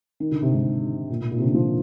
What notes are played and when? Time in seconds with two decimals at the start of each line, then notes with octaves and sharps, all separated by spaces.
0.20 D#3
0.31 D3
0.42 C3
0.53 G#2
1.10 A#2
1.21 A#2
1.31 A#2
1.38 C3
1.43 D3
1.54 F3